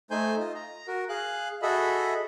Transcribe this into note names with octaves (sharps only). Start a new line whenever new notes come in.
A3 D#4 C5 G#5 G6
F4 D#5
A#5
F#4 A#4
G#4 F5 F#6
F#4 G#4 A4 D#5 E5 B5